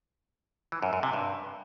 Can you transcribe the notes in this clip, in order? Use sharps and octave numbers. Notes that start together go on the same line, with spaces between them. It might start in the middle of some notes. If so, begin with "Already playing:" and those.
E3
F#2
F#2
C3
G2